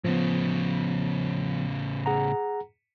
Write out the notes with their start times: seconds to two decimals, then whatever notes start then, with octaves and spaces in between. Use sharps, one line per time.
0.04 A2 C#3 F3 B3
2.06 G#4 F#5 A#5